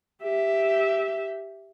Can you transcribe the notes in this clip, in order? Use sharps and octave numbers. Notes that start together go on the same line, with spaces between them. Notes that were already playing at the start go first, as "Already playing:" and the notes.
G4 E5